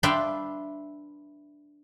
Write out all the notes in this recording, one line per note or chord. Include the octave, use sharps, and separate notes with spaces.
D4 B4 E5 F5 G5 C6